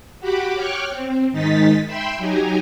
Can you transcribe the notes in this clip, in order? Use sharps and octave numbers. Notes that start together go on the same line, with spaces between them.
F#4 G4 F#5 B5 D6
C#5 G5 C#6 D6 F6 F#6
C4
G#2 D#3 G#3 D#4 A6 B6
E5 G5 B5 C6 E6
F#3 D#4 G4 G#5 A#5